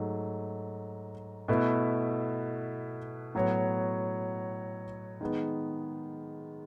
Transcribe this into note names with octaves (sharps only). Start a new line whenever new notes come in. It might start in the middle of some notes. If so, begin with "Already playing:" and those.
Already playing: G#2 F#3 A3
B2 A3 E4 B4
A2 F#3 B3 F#4 C#5
D#3 G#3 B3